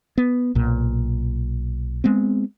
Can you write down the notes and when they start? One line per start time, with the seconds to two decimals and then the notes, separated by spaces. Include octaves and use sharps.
0.18 B3
0.55 B1 A#2
2.04 G#3 B3 C4